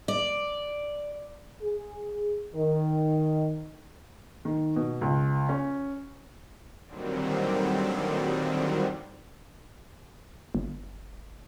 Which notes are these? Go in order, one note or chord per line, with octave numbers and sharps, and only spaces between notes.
D5
G#4
D#3
D#3
B2
C#2
C#4
A#2 D3 D#3 F#3 G3 C4
G1